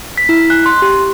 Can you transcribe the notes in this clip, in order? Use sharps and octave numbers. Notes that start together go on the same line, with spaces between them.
B6
E4
F#6
C6
G4